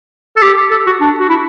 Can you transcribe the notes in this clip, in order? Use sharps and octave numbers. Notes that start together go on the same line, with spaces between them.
A4
G4
A4
F#4
D4
F#4
E4